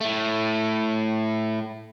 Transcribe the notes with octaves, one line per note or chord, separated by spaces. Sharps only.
A2 A3